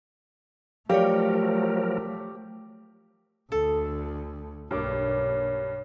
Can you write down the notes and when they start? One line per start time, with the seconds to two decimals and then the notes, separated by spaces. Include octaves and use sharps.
0.89 F3 F#3 A3 G4 A#4 C#5 D5 F5
3.52 D2 A4
4.71 B1 G2 A#3 C#5 D6